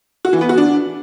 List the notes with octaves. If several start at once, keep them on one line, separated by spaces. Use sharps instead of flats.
F#4
E3
B3
F#4
D4